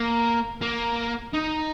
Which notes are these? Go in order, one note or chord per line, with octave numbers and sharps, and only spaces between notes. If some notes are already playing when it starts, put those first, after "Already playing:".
Already playing: A#3
A#3
D#4